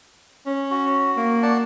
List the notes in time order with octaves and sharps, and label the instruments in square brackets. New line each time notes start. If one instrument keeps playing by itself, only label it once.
[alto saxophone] C#4
[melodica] F#4
[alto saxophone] A#3
[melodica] D5 F#5 A5